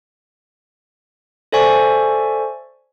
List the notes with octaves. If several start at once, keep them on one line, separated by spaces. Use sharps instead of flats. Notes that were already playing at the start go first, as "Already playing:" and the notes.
A4 C5 D5 E5 G#5 C#6